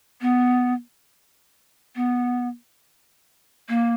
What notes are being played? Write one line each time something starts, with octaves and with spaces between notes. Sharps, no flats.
B3
B3
A#3